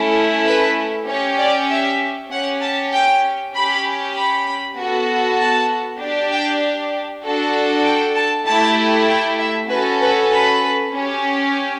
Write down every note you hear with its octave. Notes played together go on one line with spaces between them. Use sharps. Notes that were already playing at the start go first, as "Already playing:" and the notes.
Already playing: A3 C#4 E4
B4
C#4 G4 C#5
D5
E5
C#4 G4 F#5
A5
G5
C#4 G4 B5
B5
B3 F#4 A4
A5
D4 G4
G5
D4 F#4 A4
G5
A5
A3 E4 G4 A5
G5
E5
C#4 F#4 A4 B4
B4
B4
C#4 G4